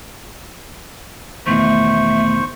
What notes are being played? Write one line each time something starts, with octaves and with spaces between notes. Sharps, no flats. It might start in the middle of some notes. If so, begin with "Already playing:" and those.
E2 B2 D#3 A3 C5 C#6